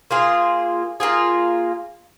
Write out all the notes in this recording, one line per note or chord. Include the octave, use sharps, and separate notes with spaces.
A#3 F4 G#4
A#3 F4 G#4